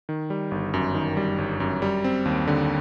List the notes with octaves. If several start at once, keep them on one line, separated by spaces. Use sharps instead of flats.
D#3
G3
G1
F#2
D#3
G3
G1
F#2
G3
C4
D#2
D3